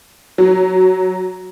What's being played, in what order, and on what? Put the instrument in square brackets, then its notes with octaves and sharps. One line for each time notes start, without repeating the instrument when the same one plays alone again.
[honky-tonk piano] F#3